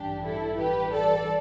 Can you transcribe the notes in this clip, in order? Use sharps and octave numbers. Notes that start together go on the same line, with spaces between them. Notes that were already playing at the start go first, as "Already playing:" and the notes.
Already playing: A1 G2 E3 D4 G4
E4 A4
G4 B4
A4 D5